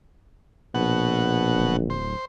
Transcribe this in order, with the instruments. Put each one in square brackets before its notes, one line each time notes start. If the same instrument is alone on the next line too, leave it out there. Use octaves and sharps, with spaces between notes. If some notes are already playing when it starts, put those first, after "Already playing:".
[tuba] A#1 [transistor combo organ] B2 F#5
[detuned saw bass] D1
[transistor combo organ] C5